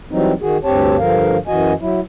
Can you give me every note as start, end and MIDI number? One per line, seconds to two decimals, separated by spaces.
0.11 0.33 52
0.11 0.33 54
0.11 0.33 55
0.11 0.33 60
0.11 0.33 63
0.41 0.57 51
0.41 0.57 66
0.41 0.57 68
0.65 0.97 38
0.65 0.97 43
0.65 0.97 60
0.65 0.97 67
0.65 0.97 73
0.65 0.97 81
0.99 1.37 43
0.99 1.37 50
0.99 1.37 53
0.99 1.37 70
0.99 1.37 77
1.47 1.73 42
1.47 1.73 52
1.47 1.73 66
1.47 1.73 75
1.47 1.73 80
1.81 2.00 54
1.81 2.00 64